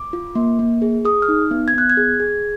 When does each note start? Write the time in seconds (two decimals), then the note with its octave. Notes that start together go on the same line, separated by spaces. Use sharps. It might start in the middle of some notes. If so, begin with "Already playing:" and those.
Already playing: D6
0.13 F4
0.35 A#3
0.59 A#3
0.82 G#4
1.05 G#4 D#6
1.22 F6
1.28 D#4
1.51 B3
1.68 G#6
1.74 B3 F#6
1.90 G#6
1.97 G#4
2.20 G#4